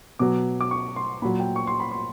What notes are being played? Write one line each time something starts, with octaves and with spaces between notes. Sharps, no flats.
B2 F#3 D6
D6
C#6
C6
A#2 F#3 B5
G5
C#6
C6
B5
C6